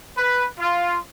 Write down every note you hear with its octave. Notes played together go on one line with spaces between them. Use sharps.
B4
F4